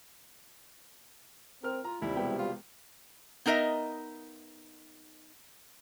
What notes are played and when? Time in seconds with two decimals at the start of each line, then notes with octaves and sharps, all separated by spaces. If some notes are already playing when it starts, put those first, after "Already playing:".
1.63 C4 A#4 F6
1.84 F4 A#5
2.02 D#2 C3 G3 E4
2.16 E1 B3 G5
2.39 F4
3.46 B3 D#4 A#4 D#5 E5